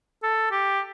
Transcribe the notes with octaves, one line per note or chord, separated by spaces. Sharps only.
A4
G4